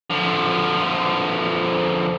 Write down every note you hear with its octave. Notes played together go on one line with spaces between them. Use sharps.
D3 F3